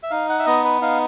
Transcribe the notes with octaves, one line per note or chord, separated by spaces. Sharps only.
E5
D#4 F5
F#5
E5
B3 D#5
B4
D#4 F5